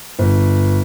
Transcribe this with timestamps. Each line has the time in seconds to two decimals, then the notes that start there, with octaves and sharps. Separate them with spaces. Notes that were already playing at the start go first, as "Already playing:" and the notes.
0.19 G1